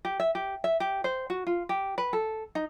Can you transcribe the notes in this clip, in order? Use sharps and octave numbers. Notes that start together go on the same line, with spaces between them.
G4
E5
G4
E5
G4
C5
F#4
F4
G4
B4
A4
D#4